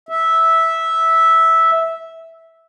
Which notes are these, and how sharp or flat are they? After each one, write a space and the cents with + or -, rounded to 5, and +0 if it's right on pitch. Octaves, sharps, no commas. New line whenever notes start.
E5 -10